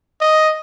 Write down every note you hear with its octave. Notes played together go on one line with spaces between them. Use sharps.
D#5